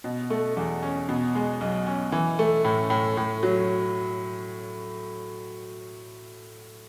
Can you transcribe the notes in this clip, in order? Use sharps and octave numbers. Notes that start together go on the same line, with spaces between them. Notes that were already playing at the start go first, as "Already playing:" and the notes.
B2
A3
E2
C#4
B2
G#3
B1
C#4
E3
A3
A2
A2
A2
F#3